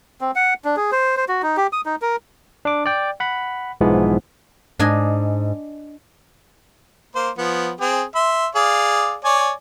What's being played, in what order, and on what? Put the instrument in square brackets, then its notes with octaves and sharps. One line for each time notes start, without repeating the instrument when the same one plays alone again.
[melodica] C4
F#5
D4
G#4
C5
C5
F#4
D#4
G4
D#6
D#4
A#4
[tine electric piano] D4 D6
D5 G5
F#5 B5
B1 G#2 E3 F3 G#3 B3
[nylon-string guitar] G#2 [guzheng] D4 D#5 G#5
[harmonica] A#3 C5
F3 B3
C4 G#4
E5 C6
G#4 D5 F5
C#5 D5 G#5